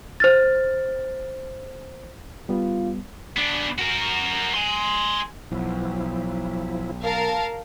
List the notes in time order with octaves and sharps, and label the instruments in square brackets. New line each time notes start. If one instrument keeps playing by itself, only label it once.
[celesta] C5 F6 A6
[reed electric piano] G3 B3 [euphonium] F4
[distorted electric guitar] B3 D4
F#4 A#4
G#5 C6
[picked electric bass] B1 [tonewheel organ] F3 E4
[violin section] A#4 F5 A5